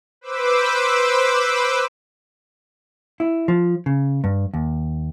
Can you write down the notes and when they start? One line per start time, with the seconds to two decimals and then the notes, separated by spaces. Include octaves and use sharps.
0.21 B4 C5 D6 E6
3.20 E4
3.48 F3
3.86 C#3
4.24 G2
4.54 D#2